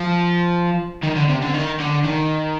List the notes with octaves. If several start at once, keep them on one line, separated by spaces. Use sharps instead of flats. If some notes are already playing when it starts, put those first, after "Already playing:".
Already playing: F3
D#3
D3
C3
D3
D#3
D3
D#3